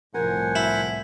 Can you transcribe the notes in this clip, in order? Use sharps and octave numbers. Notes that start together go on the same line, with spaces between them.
C2 A2 F3 A#4 C5 F#5 G#5
E4